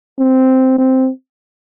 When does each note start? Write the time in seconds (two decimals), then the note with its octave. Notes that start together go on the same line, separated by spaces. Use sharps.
0.19 C4
0.79 C4